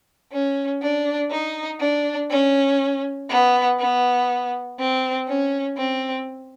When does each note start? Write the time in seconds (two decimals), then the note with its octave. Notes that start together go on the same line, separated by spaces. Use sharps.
0.32 C#4
0.81 D4
1.30 D#4
1.80 D4
2.30 C#4
3.29 B3
3.79 B3
4.79 C4
5.27 C#4
5.77 C4